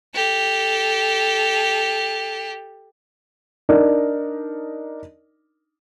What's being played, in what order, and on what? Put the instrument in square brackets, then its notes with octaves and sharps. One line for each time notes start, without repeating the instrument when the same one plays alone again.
[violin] G4 A4
[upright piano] D4 D#4 A#4